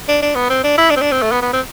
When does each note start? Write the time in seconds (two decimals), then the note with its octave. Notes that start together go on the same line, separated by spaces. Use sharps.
0.08 D4
0.22 D4
0.35 B3
0.50 C4
0.64 D4
0.78 E4
0.90 D4
0.96 C4
1.01 D4
1.12 C4
1.22 A3
1.32 B3
1.42 B3
1.53 C4